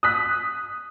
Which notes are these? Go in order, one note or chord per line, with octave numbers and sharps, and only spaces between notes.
D#6 F#6 B6